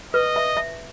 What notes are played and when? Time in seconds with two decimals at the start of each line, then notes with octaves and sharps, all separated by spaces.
0.14 B4 D#5
0.36 E5
0.57 E5